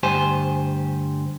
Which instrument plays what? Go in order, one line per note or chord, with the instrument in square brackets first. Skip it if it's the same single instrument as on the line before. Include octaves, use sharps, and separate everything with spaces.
[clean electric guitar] D2 G2 G4 C5 G#5